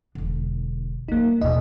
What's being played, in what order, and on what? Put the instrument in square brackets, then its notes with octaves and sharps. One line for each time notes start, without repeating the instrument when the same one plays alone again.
[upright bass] E1 D3
[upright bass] F#3 G3 [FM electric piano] A#3 D#4
[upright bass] D#2 B2 [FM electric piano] D#5